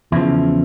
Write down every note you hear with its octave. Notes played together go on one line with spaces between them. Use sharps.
E2 C#3 F3 E4